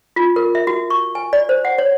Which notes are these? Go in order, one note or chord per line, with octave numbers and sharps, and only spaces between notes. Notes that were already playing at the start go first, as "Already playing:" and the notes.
F4
A#4
E5
F#4
C#6
G#5
D5
C5
F#5
C#5